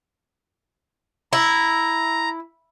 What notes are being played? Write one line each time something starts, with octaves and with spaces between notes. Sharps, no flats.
E4 A#5